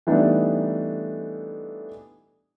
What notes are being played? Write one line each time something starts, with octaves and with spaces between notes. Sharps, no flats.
E3 G3 A3 B3 D4 D#4